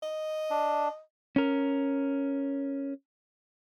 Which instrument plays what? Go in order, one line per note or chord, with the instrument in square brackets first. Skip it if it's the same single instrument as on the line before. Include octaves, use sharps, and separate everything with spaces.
[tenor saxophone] D#5
[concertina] D4
[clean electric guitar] C#4 A#4